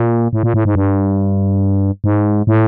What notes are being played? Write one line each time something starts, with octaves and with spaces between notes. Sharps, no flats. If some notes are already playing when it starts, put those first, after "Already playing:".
Already playing: A#2
A2
A#2
A2
G#2
G2
G#2
A2